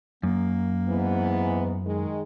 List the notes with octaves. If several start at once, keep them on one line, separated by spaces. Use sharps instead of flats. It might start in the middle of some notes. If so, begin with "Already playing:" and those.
F#2 A#3
G#2 E3 B3
D#3 G#3